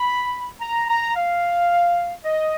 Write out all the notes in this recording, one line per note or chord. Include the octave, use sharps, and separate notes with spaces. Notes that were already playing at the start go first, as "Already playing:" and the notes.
Already playing: B5
A#5
A#5
F5
D#5